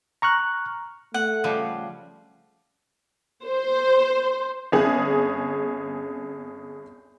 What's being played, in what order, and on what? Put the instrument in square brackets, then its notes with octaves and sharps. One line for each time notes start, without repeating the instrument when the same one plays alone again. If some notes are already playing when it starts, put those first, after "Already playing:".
[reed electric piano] A#5 C#6 F6 F#6
[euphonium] A3 [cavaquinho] F#5
[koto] C#3 F3 G3
[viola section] C5
[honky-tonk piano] G1 G#4 [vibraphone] C4 C#4